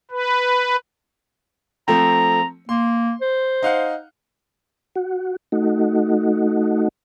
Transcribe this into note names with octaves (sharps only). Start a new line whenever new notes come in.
B4
F3 A3 C4 A#5
A#3 C6
C5
D#4 F5 F#5
F#4
A3 D#4 F#4